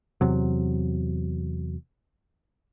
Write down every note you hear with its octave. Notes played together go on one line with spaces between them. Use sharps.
E2 C3 F#3